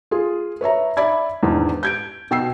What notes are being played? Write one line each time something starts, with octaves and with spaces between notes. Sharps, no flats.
F4 G#4
B4 C#5 E5 A#5
D5 E5 B5 G#6
E2 G#2 D#3 D4
G6 G#6 D7
B2 G5 E6 C7